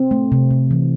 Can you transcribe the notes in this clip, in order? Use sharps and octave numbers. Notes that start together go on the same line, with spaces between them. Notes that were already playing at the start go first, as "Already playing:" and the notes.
Already playing: C4
A3
C3
C3
E3